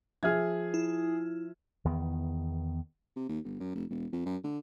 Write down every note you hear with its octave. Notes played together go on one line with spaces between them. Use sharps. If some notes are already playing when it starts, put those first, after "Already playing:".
F3 G#4 E5 F6 G#6
E4
E2 D#3 B3
C3
D#2
G1
F#2
F1
E1
F2
F#2
D3